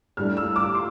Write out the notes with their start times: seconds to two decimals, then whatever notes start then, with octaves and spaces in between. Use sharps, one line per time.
0.17 A2 G3 D4 F6
0.37 E6
0.56 D6
0.75 C6